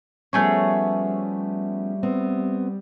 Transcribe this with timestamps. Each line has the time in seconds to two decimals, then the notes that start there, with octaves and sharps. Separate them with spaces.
0.33 F3 G3 A3 B3 C#4 G#4 C#5
2.03 B3 C4